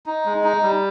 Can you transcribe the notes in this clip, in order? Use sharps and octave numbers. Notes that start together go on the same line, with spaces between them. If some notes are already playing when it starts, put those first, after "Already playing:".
D#4
G#3
D#4
G3